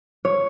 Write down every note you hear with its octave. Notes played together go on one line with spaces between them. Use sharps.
C#5